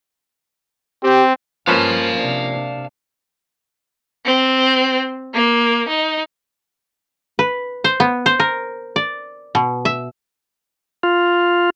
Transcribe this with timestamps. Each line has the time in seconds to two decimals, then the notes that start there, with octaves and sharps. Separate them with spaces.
1.03 C4 G4
1.67 G2 F3 A#3 C#4 B4 F5 A5
2.17 C3 D4
4.25 C4
5.34 A#3
5.89 D#4
7.39 B4
7.84 C5
8.00 B3
8.26 C5
8.40 A#4
8.96 D5
9.55 B2
9.85 E5
11.03 F4